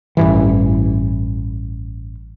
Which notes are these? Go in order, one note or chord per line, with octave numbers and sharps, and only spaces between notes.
A1 G2 E3